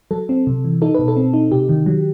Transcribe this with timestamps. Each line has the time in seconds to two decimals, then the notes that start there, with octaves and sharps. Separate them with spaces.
0.11 F#3 A4
0.29 C4
0.47 C3
0.65 E3
0.82 D#4 A4
0.94 B2 B4
1.08 A4
1.17 C4
1.34 D#4
1.51 C3 G4
1.69 D#3
1.86 F#3